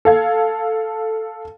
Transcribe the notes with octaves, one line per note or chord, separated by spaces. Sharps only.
A4 F5 G#6